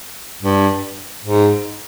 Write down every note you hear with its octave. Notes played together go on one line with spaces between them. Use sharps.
G2
G#2